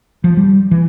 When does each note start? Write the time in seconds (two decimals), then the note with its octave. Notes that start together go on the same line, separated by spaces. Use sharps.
0.24 F3
0.37 G3
0.71 E3